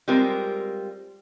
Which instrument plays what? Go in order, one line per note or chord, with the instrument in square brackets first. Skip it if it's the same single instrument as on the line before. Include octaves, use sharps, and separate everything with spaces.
[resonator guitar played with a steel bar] G3 G#3 C4 F4 A#4